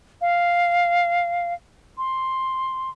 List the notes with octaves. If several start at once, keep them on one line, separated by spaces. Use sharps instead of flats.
F5
C6